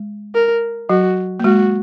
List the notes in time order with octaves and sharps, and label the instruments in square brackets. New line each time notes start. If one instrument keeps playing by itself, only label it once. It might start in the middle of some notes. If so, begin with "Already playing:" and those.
Already playing: [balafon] G#3
[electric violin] A#4
[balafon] F#3 [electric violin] F#4
[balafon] A#3
[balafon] G#3 [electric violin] F#4